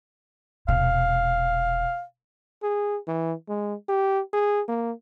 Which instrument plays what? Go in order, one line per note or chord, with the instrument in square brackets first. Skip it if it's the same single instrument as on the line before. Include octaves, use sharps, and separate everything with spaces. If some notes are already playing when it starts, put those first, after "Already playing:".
[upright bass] E1 C3 [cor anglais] F5
[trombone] G#4
E3
G#3
G4
G#4
A#3